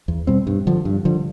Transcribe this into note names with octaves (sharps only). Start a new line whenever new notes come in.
E2
B2 G3 C4
G2
D3 F3
G2
D3 F3